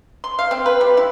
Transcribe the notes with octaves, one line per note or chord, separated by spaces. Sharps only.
C6
F5
C4
B4
G3
E4